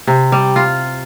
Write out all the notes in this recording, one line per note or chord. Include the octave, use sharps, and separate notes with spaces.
C3
G3
F4